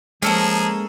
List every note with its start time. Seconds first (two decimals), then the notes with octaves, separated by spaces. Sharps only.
0.22 F3 G#3 A#3 C#4 G#4 A4 A#5